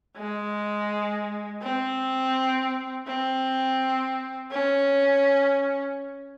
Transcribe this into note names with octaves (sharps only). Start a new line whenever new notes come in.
G#3
C4
C4
C#4